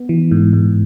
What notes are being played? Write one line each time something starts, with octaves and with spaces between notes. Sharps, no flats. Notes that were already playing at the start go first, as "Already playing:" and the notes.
Already playing: B3
E3
G#2
G#2